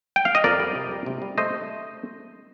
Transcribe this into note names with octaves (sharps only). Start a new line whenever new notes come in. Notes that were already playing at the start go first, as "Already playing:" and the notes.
G5
F5
D#5
F2 A#4 D5
G3
C3
G3
C3
G3
A3 C5 D#5